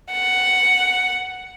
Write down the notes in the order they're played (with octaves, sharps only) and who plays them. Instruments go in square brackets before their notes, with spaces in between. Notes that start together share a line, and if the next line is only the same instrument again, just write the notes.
[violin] F#5